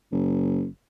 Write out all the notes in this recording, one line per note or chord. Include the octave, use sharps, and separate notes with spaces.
F#1